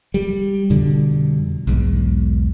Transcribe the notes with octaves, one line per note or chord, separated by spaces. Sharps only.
G3
F2 B2 D3 G3
B1 E2 G#2